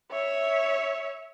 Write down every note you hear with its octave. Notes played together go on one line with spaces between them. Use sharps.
C#5 E5